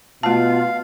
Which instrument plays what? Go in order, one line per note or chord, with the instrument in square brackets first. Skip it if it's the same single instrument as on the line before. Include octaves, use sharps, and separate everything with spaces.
[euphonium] B2 [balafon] A3 A5 [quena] F4 [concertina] F5